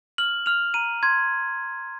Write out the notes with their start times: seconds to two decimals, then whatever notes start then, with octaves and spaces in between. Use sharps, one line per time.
0.18 F6 F#7
0.46 F6 F7
0.74 A#5 D#7
1.03 C6 G#6